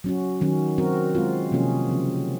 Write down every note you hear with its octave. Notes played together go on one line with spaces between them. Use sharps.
F#3 C#4 F#4
D#3 F#3 C#4
F#3 C4 F#4 A#4
G#3 C4 F4
C3 F3 A#3 C#4 G#4
C#3 F3 C4